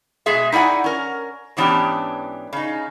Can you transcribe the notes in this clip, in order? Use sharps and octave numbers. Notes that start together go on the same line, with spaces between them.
B2 G#3 G#4 E5
D#4 E4 D5 F#5 G#5
C#4 A#4
G#2 E3 B3 C#4 D4 G4
C#3 D#4